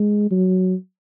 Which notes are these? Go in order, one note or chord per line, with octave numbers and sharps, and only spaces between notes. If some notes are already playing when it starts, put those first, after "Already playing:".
Already playing: G#3
F#3